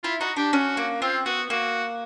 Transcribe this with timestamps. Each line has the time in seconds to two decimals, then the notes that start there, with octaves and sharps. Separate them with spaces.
0.04 E4 F4
0.20 D#4 F#4
0.37 D4 G4
0.53 C#4 F#4
0.77 A#3
1.01 C4 F4
1.25 B3 F#4
1.50 A#3 F#4